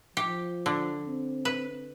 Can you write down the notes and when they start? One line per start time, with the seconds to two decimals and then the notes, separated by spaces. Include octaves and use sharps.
0.17 F3 G4
0.66 D3
1.05 C4
1.45 B4